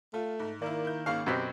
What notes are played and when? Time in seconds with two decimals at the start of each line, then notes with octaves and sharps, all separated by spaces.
0.14 A3 F4
0.39 G#2
0.62 D#3 A#3 E4 D5
0.85 E4 G6
1.06 G#1 C#3 A#3 F5 C#6
1.26 F#2 B2 C4 F#4 G4 B6